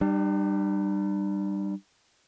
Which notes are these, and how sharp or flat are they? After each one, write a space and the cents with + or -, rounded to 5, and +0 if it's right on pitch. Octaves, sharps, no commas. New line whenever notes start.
G3 +0 D4 +45